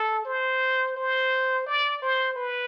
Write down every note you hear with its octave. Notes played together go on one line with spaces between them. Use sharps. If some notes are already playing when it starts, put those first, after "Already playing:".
Already playing: A4
C5
C5
D5
C5
B4